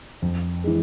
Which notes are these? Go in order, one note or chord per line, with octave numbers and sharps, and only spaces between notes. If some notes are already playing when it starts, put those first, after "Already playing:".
F2
E3 G#3